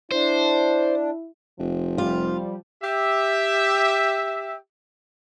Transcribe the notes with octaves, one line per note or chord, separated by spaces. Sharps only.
D4 E4 C5
F1 F3
G3 F4
G4 E5